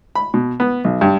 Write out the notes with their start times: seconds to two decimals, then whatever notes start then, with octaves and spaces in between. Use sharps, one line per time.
0.15 B5
0.34 B2
0.60 B3
0.84 B1
1.01 G2